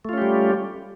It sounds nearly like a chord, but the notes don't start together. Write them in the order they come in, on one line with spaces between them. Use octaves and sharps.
A3 F4 C#4 G4 G3